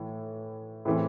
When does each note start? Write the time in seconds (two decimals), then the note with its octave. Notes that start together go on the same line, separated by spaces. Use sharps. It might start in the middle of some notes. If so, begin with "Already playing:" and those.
Already playing: A2 E3
0.85 A2 E3 C4